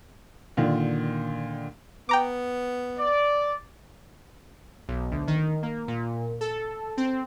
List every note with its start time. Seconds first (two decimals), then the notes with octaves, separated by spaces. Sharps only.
0.57 A#2 D3 D#3 F4
2.09 B3 G5 A#5 D6
2.97 D5
4.88 B1
5.11 D2
5.27 D#3
5.63 A#3
5.88 A#2
6.41 A4
6.97 C4